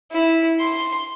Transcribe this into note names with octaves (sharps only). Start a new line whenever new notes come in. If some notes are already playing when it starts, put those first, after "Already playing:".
E4
C6